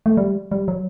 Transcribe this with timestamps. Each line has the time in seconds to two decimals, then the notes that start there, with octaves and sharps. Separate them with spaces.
0.06 A3
0.17 G3
0.51 G3
0.68 F#3